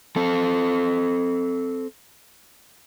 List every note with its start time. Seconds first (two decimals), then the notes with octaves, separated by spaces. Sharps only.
0.16 C4 A4